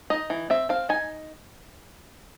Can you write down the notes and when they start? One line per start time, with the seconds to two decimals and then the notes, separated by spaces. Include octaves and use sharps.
0.10 D#4 D#5
0.30 E3
0.50 C4 E5
0.69 C4 F5
0.89 D#4 G#5